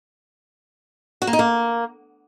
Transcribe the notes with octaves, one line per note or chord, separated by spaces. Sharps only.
F#4
A#3
D#4
A#3